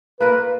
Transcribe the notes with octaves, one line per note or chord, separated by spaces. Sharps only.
A#3 F4 A#4 B4